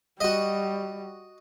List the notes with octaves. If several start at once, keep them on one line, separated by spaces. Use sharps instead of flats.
G3 F#4 D#5